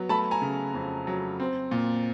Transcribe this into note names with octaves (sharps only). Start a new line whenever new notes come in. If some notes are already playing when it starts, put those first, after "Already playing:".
Already playing: F#3 B3
A3 A5 B5
G#5 A#5
C#3
F2
F#3
C4
A#2